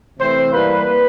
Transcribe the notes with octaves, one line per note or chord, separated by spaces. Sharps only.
C3 E3 A3 C4 C5
E3 G3 A#3 B4